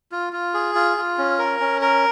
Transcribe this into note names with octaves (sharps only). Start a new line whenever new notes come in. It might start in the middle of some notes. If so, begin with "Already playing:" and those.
F4
F4
G#4
F4
F4
C#4
A#4
C#4
A#4